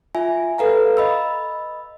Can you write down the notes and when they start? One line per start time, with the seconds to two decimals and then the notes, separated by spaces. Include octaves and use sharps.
0.15 F4 E5 G#5
0.58 A4 B4 F5 A#5
0.97 D#5 B5 E6